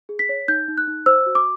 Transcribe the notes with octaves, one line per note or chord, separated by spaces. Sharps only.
G#4
B6
C#5
D#4 G6
D#4
F#6
D#4
C5 E6
F#4
D6